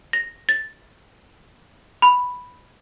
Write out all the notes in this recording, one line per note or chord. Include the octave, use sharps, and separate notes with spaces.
A#6
A6
B5